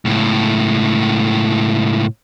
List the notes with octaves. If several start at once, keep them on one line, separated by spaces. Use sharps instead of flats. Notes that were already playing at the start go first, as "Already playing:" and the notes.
C#2 A2